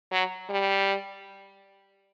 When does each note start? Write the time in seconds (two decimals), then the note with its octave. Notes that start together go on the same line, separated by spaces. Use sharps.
0.12 F#3
0.50 G3